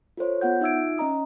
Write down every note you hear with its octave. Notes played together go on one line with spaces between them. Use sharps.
F4 A4 C5 C#5
B3 F4 F#5 G6
D#4 F4 E5 E6 G#6 D7
C#4 D#5 A#5 D#6